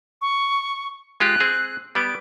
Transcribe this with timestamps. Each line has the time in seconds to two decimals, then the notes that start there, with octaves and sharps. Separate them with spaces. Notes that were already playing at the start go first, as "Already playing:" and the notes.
0.21 C#6
1.20 G#3 F4 G4 F#6
1.40 C4 G#4
1.95 G3 B3 D7